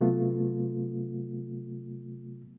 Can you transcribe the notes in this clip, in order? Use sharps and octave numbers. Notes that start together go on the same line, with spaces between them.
C3 F#3 A3 B3 F4